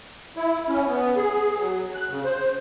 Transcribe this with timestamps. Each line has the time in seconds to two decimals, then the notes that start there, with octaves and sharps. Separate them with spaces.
0.37 E4
0.68 C#4
0.86 B3
1.16 G#4
1.59 F#3
1.95 F#6
2.10 C#3
2.24 C5